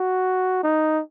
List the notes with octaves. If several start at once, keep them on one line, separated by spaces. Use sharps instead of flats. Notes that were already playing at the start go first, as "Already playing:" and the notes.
Already playing: F#4
D#4